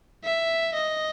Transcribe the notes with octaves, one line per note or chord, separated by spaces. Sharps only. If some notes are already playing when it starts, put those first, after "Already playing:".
E5
D#5